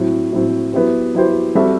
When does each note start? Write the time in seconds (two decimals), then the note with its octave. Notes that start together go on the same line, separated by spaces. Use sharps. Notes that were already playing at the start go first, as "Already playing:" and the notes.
Already playing: A2 F#3 C4
0.32 A2 F#3 C4
0.73 F#3 B3 E4 G4 C5
1.15 F#3 B3 E4 G4 C5
1.55 G3 C4 F#4 A4 E5